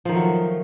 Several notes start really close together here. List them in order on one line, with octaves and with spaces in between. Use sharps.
F3 D#3 A3 F#3